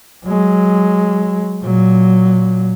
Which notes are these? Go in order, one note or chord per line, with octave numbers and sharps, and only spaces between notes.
F#3 G#3
A#2 F#3